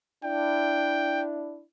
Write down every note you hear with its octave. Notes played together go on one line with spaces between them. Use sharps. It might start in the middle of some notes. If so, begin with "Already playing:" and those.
D4 E4 G5